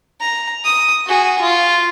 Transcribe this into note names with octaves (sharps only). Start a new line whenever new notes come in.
A#5
D#6
F#4 G#4
F4